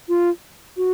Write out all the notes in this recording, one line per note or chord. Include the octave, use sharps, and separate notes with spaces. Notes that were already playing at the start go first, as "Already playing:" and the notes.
F4
F#4